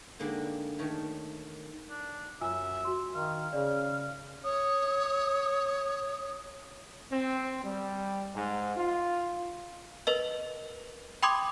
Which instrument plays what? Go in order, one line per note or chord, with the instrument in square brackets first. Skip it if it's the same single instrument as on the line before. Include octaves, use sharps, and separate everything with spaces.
[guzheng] D3 G3 G#3 A#3 D#4
D#3 A3 C#5
[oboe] D4
[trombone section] F#2 [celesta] F4 G#5 E6 [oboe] E5
[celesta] F#4 C6
[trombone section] D#3 [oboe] F5
[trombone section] C#3 [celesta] D5
[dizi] C#5 [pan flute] D#6
[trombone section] C4
G3
G#2
F4
[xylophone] A#4 B4 D#5
G5 B5 C6 D6 D#6 G#6